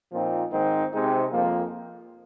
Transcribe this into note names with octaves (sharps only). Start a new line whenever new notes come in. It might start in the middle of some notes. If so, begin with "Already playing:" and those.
A#2 F3 C4 D#4
G#2 D#3 C4 D#4
C3 G#3 C4 D#4
F2 F3 A#3